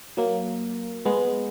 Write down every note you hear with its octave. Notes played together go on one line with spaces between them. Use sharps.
F#3 A#3
G#3 B3